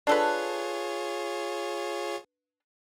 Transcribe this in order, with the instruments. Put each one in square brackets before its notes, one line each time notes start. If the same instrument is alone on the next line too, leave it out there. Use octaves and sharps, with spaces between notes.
[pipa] D4 A4 B4 [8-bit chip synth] F4 G#4 C#5